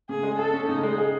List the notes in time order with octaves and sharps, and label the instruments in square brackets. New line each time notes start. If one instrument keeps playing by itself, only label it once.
[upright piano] C#3 [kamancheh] G#4
[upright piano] G#3
[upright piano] G#4 [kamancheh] A4
[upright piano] C#4
[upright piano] C#3 [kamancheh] D#4
[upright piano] G#3
G#4